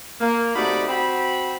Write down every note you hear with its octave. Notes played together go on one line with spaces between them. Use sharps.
A#3
C3 A3 D#4 F#4 D5 B5
C4 F#4 G5 B5